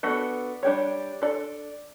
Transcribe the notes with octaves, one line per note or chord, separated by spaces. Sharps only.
B3 D4 F#4 A4
G3 D4 G4 C#5
D4 A4 D5